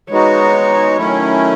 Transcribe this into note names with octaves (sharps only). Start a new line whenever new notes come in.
G#3 B3 D#4 F#4 C#5
D#3 F#3 A3 C#4 E4